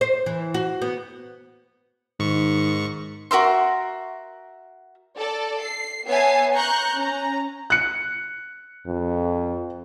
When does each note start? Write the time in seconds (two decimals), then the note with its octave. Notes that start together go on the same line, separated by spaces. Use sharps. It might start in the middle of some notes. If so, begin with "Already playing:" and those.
0.01 C5
0.26 E3
0.54 F#4
0.82 B3
2.20 G#2 D#3 C#6
3.31 F#4 A#4 E5 C6
5.18 A4 D5
5.62 C7
6.08 B3 C#5 E5 G#5 A5 C7
6.54 A#5 C#6 F#6 G6
6.96 C#4 A#5
7.70 F#6 C#7
8.87 F2